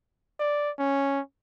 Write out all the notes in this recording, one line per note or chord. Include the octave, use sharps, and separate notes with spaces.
D5
C#4